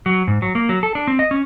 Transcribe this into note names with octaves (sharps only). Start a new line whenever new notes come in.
F#3
G#2
F#3
A#3
F#3
A4
D4
C4
D#5
C#4